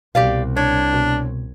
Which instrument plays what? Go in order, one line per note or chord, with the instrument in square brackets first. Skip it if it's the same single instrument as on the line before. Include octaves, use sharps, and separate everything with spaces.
[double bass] C2 [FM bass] B2 [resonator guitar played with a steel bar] G4 D5 F5
[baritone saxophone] D4 [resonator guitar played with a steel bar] C#5
[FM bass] B2